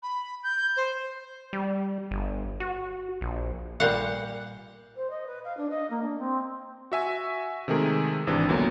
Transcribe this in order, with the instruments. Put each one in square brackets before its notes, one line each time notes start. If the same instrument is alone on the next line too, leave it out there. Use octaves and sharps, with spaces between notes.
[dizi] B5
G6
C5
[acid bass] G3
G1
F#4
A#1
[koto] A#2 G3 F5 F#5
[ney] C5
D#5
B4
F5
D4
D#5
A#3
D4
C4
[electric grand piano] F#4 E5 G#5
C3 D#3 G#3 A3 G#4 A#4
G#1 C3 E3 D4
C#2 D3 F#3 A#3 B3